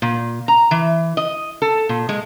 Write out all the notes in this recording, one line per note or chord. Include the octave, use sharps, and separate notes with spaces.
A#2
A#5
E3
D#5
A4
A#2
G#3